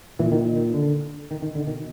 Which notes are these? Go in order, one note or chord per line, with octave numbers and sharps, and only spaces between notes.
A#2 E3
D#3
D#3
D3
D#3
D#3
D3
B2 D#3